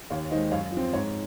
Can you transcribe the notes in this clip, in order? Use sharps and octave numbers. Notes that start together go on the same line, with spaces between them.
D#2 C#5 F5
D#3 G#3 C5 D#5
F#2 C#5 F5
F3 C4
G#2 C#5